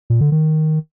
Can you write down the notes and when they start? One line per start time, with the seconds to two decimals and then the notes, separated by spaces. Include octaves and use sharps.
0.10 A#2
0.21 D3
0.32 D#3